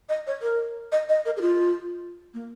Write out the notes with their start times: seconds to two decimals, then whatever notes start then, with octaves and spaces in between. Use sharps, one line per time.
0.09 D#5
0.27 C#5
0.42 A#4
0.92 D#5
1.09 D#5
1.26 A#4
1.37 G#4
1.41 F4
2.34 A#3